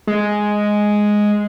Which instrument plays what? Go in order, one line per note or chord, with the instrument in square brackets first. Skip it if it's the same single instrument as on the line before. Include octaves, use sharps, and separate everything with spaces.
[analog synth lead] G#3